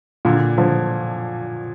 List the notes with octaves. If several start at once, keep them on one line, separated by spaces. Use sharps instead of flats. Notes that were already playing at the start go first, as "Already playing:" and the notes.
A#2 D3
D3 F3